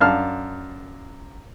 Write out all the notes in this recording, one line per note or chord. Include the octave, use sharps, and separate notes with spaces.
F#2 D4 F5 A5 F6